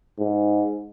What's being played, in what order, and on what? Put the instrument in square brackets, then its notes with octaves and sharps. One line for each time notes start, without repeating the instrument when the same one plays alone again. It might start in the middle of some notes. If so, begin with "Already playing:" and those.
[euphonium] G#2